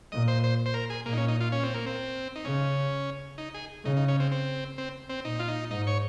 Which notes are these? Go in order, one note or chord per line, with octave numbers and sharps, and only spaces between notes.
A#2 D#5
C5
C5
C5
A#4
G#4
A#2 A#3
D#4
C#4
D#4
F4
C#4
C4
A#3
C4
D#4
C#3 C#4
D#4
G#4
C#3 D#4
D#4
C#4
C4
C4
C4
C4
A#2 D#4
F4
D#4
G#2 D#4
C#5